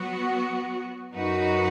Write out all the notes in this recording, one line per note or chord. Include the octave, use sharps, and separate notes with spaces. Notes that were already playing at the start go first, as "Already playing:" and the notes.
Already playing: F#3 B3 F#4
F#2 F#3 D#4 F#4 B4